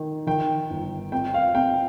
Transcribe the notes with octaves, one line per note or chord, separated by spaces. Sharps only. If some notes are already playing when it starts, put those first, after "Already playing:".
Already playing: D#3
D#3 G5
G1
C4 G5
F5
C4 G5